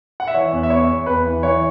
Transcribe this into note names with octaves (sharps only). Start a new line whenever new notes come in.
F#5
E5
E3 C#5
E2
E5
B3 C#5
E2
E2 B4
E3
E3 C#5